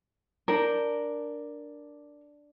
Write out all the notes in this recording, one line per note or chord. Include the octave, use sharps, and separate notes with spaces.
D4 A#4 G5